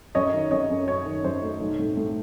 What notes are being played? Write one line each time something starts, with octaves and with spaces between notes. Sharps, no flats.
F#2 C#5 D#5
D#3
F#2 C#5 D#5
F#2
F#2 C#5
D#3
F#2 C5
A3
B1
A2
A2